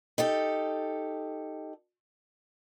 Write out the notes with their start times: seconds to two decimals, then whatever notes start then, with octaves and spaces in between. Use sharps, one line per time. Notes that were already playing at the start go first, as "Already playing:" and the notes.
0.18 D#4 G4 A4